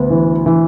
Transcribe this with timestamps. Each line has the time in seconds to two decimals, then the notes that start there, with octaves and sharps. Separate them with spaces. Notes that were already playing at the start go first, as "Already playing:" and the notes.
Already playing: D2 B3
0.10 E3
0.46 E3